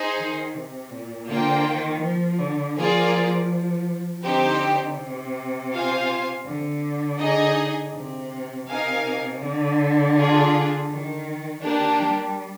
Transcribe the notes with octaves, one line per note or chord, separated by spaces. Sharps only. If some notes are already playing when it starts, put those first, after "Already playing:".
Already playing: D#4 G#4 C5
D#3
C3
A#2
D3 A#3 F4 C5 G5
D#3
F3
D3
F3 A#3 F4 G#4 D5
D3 C4 D#4 G4 C5
C3
F4 C5 F5 G#5
D3
D#4 G#4 D#5 G#5
C3
C3 D#4 A#4 F5 G#5
D3
D4 F4 G#4
D#3
D#3 A#3 D4 G4
G3